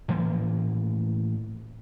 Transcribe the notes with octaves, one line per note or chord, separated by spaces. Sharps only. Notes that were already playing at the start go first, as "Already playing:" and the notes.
A2 E3 F3 A#3